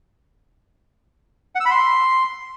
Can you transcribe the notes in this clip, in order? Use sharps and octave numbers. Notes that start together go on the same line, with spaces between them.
F#5
E6
B5
C6